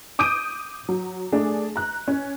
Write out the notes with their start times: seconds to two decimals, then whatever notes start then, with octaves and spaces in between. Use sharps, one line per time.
0.19 D6 D#6 G6 D7 D#7
0.89 F#3
1.32 A3 D4 G#4
1.76 A#5 F#6
2.08 C#4